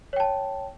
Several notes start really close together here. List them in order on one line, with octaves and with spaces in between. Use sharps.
C#5 G5 A5